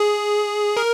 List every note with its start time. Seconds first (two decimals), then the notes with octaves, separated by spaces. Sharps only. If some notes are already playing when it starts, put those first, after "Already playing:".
Already playing: G#4
0.77 A#4